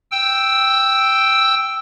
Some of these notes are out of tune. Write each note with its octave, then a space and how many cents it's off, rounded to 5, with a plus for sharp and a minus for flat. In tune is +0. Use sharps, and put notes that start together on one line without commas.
G5 +0 E6 +0